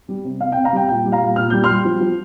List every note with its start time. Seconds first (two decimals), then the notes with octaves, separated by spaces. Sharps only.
0.09 G3
0.24 C3
0.40 C3 F5
0.52 G5
0.57 C3
0.64 F5 A#5
0.73 G3 G5
0.88 A#2 G5
1.05 G3
1.12 F5 A#5
1.21 A#2
1.36 A#2 F6
1.50 G3 G6
1.64 C6 F6
1.69 G3
1.85 F3
2.00 F3